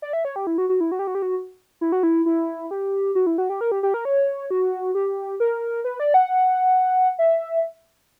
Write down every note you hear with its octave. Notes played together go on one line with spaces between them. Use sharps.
D5
E5
C#5
G4
E4
F#4
F#4
E4
F#4
G4
F#4
G4
F#4
E4
F#4
E4
E4
G4
F#4
E4
F#4
G4
A#4
G4
G4
A#4
C#5
F#4
G4
A#4
B4
D5
F#5
E5